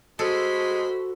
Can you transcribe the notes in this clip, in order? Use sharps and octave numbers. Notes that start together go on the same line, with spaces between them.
G#3 F#4 A4 C5 B5